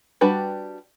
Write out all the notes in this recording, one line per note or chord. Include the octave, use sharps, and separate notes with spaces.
G3 D4 F#4 G4 B4